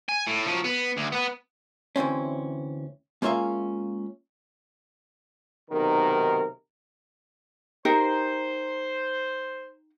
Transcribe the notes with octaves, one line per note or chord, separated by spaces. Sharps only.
G#5
A2
F3 F#3
B3
D2
B3 B4
D2 E3 C4 C#4
G#3 A#3 C#4 F4 E5 F5
B1 C3 D#3 A#4
D#4 G4 A#4 C5